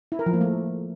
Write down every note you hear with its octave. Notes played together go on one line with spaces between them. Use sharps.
E4
A#4
F3
A#3
A3